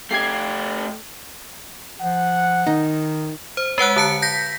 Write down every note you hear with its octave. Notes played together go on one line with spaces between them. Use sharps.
A3 G4 G#6 C7
F3 F#5
D#3 D#4
C5
G#3 B4 F#5 F#6
D3 A5 C#7
G6 A#6 B6